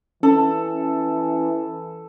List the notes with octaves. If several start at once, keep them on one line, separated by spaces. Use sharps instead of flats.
E3 C#4 A4